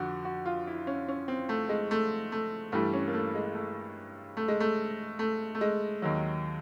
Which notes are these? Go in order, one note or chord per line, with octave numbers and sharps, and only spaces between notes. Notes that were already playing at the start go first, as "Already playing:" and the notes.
Already playing: F2 D3 F#4
F#4
F4
E4
C#4
C#4
C4
A3
G#3
A3
A3
G2 E3 G3 A3
C#4
A#3
A3
G#3
A3
A3
G#3
A3
A3
A3
G#3
D#2 D#3 F#3